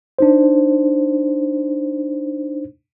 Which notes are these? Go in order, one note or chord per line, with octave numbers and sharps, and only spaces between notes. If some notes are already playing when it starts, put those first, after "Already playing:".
D4 D#4 C5